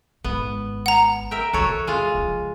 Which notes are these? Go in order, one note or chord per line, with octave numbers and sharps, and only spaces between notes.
G#1 B3
F#5 A#5
A#4 E5 G5
E2 C3 F#4 A4 C#5
G#3 F4
C#3 F3